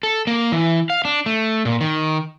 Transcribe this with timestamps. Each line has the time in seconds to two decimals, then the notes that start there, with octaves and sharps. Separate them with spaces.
0.03 A4
0.27 A#3
0.52 E3
0.90 F5
1.05 D4
1.26 A3
1.65 A#2
1.81 D#3